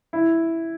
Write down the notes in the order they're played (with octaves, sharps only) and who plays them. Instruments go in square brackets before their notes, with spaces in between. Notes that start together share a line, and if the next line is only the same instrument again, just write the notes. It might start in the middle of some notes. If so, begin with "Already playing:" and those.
[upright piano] E4